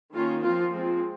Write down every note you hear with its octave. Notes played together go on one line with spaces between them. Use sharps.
D#3 A#3 C#4 F4
F3 C4 F4
F3 G#3 C4